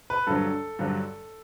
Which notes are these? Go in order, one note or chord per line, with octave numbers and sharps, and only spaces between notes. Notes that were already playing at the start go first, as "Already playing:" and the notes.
B4
G2 D3 F#3 A4
G2 D3 F#3